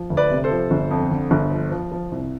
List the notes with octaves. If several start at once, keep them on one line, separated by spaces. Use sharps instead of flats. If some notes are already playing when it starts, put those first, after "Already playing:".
Already playing: F3
D2
B4 D5
C3
A4 C5
F3
G1
F2
D3
G1
F3
F3
F3
C2